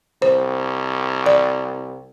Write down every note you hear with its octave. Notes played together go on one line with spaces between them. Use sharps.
C2 C5
D5